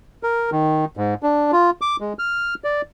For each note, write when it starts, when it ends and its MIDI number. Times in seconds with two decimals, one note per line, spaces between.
0.23 0.50 70
0.52 0.85 51
0.97 1.14 44
1.23 1.51 62
1.52 1.70 65
1.81 1.96 86
2.00 2.13 56
2.19 2.54 89
2.64 2.81 74